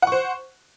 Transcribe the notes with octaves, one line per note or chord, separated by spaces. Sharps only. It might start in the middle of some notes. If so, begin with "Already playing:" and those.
C5 F#5 C#6